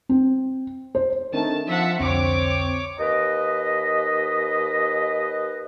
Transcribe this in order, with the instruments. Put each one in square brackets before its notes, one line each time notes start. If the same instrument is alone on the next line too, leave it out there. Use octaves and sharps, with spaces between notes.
[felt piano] C4
C5
[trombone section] D#3 A3 [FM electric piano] C4 D4 [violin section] A5
[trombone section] F3 [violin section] E5 F#5 A5
[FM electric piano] C2 F2 D3 [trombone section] C4 [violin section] C#5 D6
[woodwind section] D#2 B4 D#5